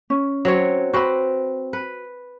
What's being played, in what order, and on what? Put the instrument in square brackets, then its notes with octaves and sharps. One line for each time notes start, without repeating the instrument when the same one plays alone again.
[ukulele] C#4
[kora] F#3 C4 C#5
[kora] C4 B4 [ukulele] F#4 B5
[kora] B4